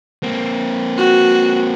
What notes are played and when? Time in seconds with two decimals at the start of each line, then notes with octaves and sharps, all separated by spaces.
0.23 A#3 C4
0.98 F#4